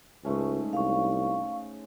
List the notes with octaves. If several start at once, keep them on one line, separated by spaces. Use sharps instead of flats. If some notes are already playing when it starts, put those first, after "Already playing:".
C#2 G#2 A3 C#4
C2 F5 C#6